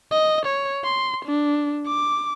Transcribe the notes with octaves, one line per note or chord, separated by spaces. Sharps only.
D#5
C#5
C6
D4
D6